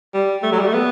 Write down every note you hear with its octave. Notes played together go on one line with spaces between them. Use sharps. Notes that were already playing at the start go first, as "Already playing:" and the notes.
G3
A3
F#3
G3
A3
B3